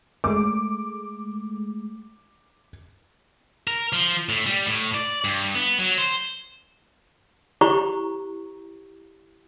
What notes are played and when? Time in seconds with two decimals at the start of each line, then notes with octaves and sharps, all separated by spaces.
0.24 G#3 A3 D6
3.67 A#4
3.93 F3
4.29 A2
4.46 G3
4.66 A2
4.94 D5
5.24 G2
5.55 B3
5.79 F#3
5.98 C5
7.61 E4 G4 C5 A#5 C#6